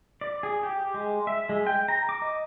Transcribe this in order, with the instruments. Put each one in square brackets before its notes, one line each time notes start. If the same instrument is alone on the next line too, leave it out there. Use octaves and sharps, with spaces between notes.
[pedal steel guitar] D5
G#4
G4
G#3
E5
G#3
G5
A#5
D6
D#5